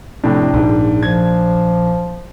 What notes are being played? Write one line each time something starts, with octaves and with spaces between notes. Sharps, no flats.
F2 A2 C3 D4
A#1 G#2
F3 G#6